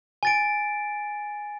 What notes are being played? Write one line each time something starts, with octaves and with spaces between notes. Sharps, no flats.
G#5 A6 D7